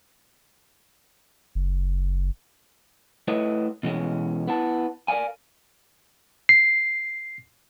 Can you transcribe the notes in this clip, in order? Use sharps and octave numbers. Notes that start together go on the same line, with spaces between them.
F#1
A3 E4 B4 C#5 D#5
B2 E3 G#3 C#4
B3 E4 A5
A#4 D5 D#5 F5 G#5
C7